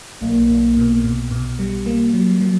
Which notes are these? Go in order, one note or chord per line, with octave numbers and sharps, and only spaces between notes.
B1 A#3
B1
B2
B2
B2
G3
A#3
F#3
F#3